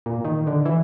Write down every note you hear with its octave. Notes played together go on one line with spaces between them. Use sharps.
A#2
D#3
D3
E3